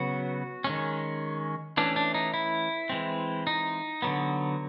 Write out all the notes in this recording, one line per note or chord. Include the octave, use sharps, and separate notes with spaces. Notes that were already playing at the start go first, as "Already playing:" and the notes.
Already playing: C#3 F#3 B3 F#4
D#3 G#3 C#4
E3 A3 C#4 D4
D4
D#4
E4
E3 G#3 C4
D#4
D3 F#3 B3